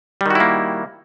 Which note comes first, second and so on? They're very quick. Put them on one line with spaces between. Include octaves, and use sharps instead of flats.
G3 D#3 F#4 E4 A#3